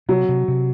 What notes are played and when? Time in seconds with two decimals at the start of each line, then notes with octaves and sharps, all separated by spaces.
0.09 C3 F#3
0.29 C3
0.48 C3